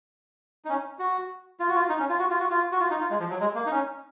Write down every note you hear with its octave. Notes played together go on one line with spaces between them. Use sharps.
D#4
C#4
F#4
F4
F#4
F4
D#4
C#4
F4
F#4
F4
F#4
F4
F#4
F4
D#4
F4
G#3
F3
F#3
G#3
A#3
D#4
C#4